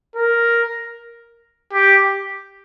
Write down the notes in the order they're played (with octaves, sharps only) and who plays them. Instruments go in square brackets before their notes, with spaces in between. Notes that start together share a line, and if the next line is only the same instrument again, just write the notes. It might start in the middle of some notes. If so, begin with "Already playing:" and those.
[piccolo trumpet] A#4
G4